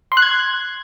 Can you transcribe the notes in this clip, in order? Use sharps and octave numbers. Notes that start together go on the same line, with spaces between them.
C6
F#6
G#6